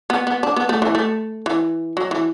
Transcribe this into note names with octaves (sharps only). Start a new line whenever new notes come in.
B3
B3
D4
B3
A3
E3
A3
E3
F#3
E3